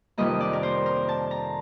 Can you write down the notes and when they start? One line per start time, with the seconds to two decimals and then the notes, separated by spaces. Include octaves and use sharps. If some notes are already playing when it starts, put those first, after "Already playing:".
0.18 F2 C3 D#3 G3 A#3 D#5
0.40 D5
0.53 A#4
0.63 C5
0.86 A#4
1.09 A5
1.31 A#5